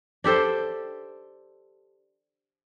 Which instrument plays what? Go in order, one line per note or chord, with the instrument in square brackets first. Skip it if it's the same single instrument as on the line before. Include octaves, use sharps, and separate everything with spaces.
[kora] D4 G4 A4 C5